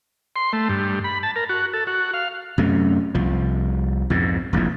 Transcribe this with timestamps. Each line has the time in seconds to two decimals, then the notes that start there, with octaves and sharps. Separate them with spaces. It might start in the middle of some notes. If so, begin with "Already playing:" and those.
0.36 C6
0.53 A3
0.69 G2
1.04 B5
1.23 A5
1.36 A#4
1.49 F#4
1.73 A4
1.87 F#4
2.14 F5
2.58 F#2 C3 A3
3.15 C2 F3
4.10 F2 G#2 B2
4.53 F1 A#1 F2 E3